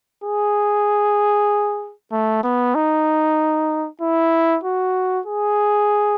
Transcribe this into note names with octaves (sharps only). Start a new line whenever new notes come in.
G#4
A3
B3
D#4
E4
F#4
G#4